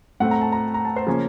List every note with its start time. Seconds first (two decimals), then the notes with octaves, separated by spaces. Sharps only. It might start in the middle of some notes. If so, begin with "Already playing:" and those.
0.20 A2 A3 C4 F#5
0.31 A#5
0.41 A5
0.52 A#5
0.74 A#5
0.85 A5
0.96 C5
1.07 C#3 F3 A#3 C#4